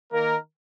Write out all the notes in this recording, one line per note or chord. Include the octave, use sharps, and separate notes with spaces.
D#3 A#3 A#4